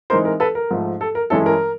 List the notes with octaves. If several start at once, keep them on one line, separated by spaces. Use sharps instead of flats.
E3 G#3 C4 D#4 A#4 C5
A#4
A4 B4
A#4
G#2 F3 A3
A4
A#4
G2 E3 G#3 C#4 E4 A4
A#4